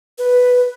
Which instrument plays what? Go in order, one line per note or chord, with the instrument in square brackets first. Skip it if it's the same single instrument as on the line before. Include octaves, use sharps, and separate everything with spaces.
[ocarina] B4